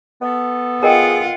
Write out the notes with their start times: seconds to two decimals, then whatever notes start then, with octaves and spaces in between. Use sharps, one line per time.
0.21 B3 A4
0.83 F4 G#4 A#4 D#5 F#5 G5